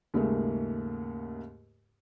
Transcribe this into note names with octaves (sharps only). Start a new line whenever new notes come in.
D#2 G#2 C#3 A3 A#3